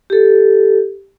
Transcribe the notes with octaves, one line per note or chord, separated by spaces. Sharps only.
G4 A4